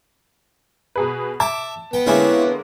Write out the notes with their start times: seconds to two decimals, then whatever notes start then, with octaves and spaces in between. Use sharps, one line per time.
0.96 B2 G#4 B4
1.40 E5 A5 D6
1.93 B3 G5
2.06 D3 G#3 A#3 C4 C#4 E4